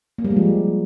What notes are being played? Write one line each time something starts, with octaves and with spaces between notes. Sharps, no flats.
A#3
G3
G#3
F3